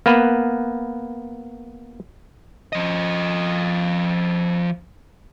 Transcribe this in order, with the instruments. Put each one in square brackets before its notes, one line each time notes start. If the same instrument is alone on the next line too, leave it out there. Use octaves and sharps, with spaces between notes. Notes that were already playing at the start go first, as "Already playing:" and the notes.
[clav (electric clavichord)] A#3 B3 B4
[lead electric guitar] F3 D#5